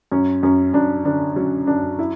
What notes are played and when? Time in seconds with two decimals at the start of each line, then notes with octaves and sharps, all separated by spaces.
0.12 F#2 C#4
0.43 F#2 C#4
0.74 F#2 D4
1.05 D3 D4
1.36 F#3 C#4
1.67 F#2 D4
1.99 E4